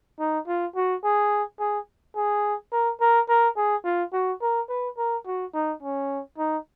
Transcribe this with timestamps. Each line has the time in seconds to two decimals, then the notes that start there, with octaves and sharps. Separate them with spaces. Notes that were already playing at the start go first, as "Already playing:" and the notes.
0.19 D#4
0.47 F4
0.76 F#4
1.04 G#4
1.59 G#4
2.16 G#4
2.72 A#4
3.01 A#4
3.29 A#4
3.57 G#4
3.84 F4
4.13 F#4
4.41 A#4
4.69 B4
4.97 A#4
5.26 F#4
5.54 D#4
5.82 C#4
6.38 D#4